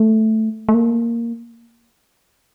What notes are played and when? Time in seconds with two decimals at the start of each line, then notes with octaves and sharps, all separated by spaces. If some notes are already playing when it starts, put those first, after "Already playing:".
Already playing: A3
0.69 A3
0.74 A#3